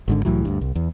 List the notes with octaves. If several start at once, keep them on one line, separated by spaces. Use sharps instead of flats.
G#1 G#2 D3
C2 A2 E3 F#3
D2 G2
C2
E2